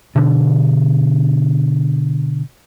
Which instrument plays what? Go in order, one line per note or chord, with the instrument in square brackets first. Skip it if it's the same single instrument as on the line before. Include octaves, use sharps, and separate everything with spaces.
[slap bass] B2 D3 D4